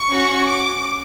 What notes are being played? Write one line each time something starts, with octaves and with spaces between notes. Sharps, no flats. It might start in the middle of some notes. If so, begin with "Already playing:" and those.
Already playing: C#6
C#4 F#4
D6